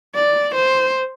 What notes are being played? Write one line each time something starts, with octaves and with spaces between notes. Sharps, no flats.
D5
C5